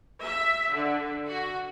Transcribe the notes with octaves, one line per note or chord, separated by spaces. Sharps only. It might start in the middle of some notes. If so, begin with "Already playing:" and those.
E5
D3
F#4